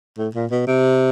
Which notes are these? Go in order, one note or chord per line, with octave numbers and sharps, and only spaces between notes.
A2
A#2
B2
C3